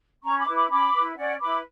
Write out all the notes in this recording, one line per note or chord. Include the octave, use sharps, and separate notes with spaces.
C#4 A#5 C#6
B5 D6
E4 B4
B5 D6
C#4 B5 D6
E4 B4
C#4 D5 F#5
E4 B4 B5 D6